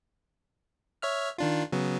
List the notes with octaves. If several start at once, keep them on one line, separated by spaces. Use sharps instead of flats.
C#5 E5 F6
D#3 D4 F4
C#3 F#3 B3